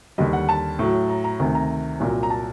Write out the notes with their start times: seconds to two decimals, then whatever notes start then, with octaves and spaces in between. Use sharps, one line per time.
0.18 D#2 D3 G3 D#5
0.33 F#5
0.49 A5
0.79 A2 F#3
1.09 A#5
1.24 A#5
1.39 D2 C3 D#3
1.55 A#5
2.00 C2 A#2 F#3
2.23 A#5
2.30 A5